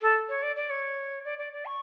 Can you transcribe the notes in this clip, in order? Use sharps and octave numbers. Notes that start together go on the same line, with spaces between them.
A4
C#5
D5
D5
C#5
D5
D5
D5
C#6